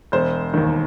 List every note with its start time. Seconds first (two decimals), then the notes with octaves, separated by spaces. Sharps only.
0.12 E1 C5
0.54 D#2 D#3